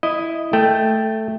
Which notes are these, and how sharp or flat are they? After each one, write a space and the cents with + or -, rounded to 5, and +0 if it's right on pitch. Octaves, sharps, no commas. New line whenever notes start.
E4 +0 D#5 +0
A3 +0 G5 +0